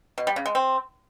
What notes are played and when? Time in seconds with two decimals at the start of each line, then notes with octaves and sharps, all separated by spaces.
0.18 B2
0.27 G3
0.36 C#3
0.46 G#3
0.55 C4